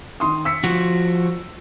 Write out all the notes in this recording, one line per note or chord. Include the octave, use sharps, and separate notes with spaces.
D#3 C6 D#6
E6 B6 C#7
F3 F#4